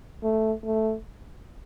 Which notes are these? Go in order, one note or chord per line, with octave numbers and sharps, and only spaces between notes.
A3
A3